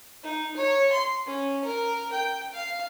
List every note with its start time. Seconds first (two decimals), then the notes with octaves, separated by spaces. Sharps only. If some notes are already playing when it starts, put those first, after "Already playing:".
0.23 D#4
0.57 C#5
0.92 C6
1.26 C#4
1.64 A#4
2.12 G5
2.53 F5